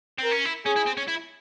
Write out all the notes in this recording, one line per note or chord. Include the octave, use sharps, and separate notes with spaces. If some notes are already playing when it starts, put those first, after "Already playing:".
C4
A#4
C#4
E4
C#4 G#4
E4
C4
C#4
E4